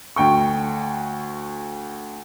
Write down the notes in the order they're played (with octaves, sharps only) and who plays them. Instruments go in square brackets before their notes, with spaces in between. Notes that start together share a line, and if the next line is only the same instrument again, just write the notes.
[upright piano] D2 G5 C#6